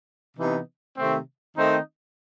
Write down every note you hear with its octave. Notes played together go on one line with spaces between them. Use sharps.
C3 E3 B3 D#4
C3 D#3 A3 C4
D#3 A3 C4 D#4